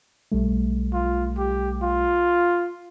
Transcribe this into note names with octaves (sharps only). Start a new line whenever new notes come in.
B1 G3 A3
F4
G4
F4